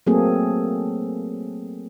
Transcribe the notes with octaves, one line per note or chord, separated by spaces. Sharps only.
F#3 A3 A#3 C4 G#4 A4